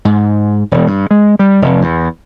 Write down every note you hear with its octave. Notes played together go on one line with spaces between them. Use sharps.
G#2
E1
G2
G#3
G3
F1
E2